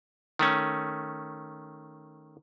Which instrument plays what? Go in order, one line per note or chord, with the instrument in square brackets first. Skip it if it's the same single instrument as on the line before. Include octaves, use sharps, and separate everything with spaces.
[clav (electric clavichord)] D#3 A3 C#4